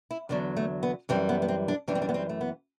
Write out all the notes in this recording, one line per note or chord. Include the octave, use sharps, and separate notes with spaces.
E4
E2 D3 F#3 D4
A3
B3
F#2 E3 G3 C4
B3
B3
C4
D4
F#2 E3 G3 D4
C4
D4
B3
C4
A3
B3